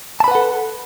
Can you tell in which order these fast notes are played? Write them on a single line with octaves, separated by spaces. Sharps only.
A5 B5 B4 F#5 A4